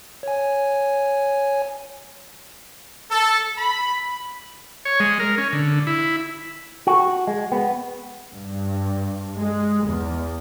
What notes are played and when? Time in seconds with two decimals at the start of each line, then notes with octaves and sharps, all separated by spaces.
0.23 C#5 G#5
3.11 A4
3.58 B5
4.85 C#5
5.00 G#3
5.20 A#4
5.38 C#4
5.53 D3
5.87 E4
6.87 F#4
7.27 G#3
7.52 B3
8.33 G2
9.36 G#3
9.87 E2